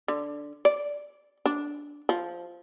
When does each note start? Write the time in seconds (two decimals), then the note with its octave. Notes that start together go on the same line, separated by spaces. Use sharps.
0.08 D3
0.65 D5
1.46 D4
2.09 F3